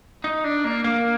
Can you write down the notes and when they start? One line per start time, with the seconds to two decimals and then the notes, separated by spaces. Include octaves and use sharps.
0.24 D#4
0.44 D4
0.64 A#3
0.84 A#3